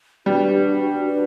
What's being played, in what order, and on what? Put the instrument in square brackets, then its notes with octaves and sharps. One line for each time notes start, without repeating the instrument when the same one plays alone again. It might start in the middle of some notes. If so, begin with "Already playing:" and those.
[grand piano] G3 [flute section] D4 F#4 B4
[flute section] D4 F#4 B4